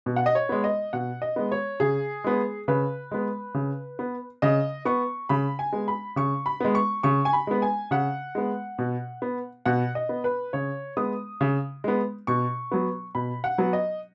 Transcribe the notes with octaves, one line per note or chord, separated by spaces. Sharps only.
B2
F#5
D#5
C#5
G#3 B3
D#5
B2 F#5
D#5
G#3 B3
C#5
C#3 G#4
G#3 B3
C#3 B4
G#3 B3
C#3
B3
C#3 D#5
B3 C#6
C#3 B5
G#5
G#3 B3
B5
C#3 C#6
B5
G#3 B3
C#6
C#3 C#6
G#5
B5
G#3 B3
G#5
C#3 F#5
G#3 B3
B2
B3
B2 F#5
D#5
B3
B4
C#3 C#5
G#3 B3 D#6
C#3
G#3 B3
B2 C#6
F#3 B3
B2 B5
F#5
F#3 B3
D#5